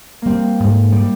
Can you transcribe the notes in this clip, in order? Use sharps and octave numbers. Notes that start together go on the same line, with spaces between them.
G3 A#3 C4
G#2
G3